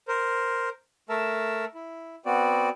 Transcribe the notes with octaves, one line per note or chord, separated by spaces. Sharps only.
A#4 C5
A3 A#4 E5 A5
E4
B3 C4 F#4 D5